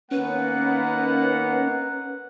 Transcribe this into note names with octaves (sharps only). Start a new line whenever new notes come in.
D#3 A#3 B3 C#4 B4 F#5